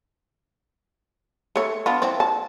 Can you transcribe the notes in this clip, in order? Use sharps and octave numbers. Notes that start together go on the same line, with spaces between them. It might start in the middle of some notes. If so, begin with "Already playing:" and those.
A3 C#5
B3 D4 F4
E3 F3 C4
A5